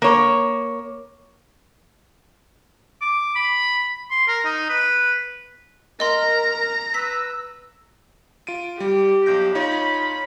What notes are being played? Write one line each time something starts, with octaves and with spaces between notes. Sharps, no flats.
A#3 C#5
D6
B5
C6
A#4
D#4
B4
A#4 D#5 A#5 C6
B4 E6 B6
F4 D7 D#7
G3 G4
B1 G6 A#6
D#4 F4 C#5 B5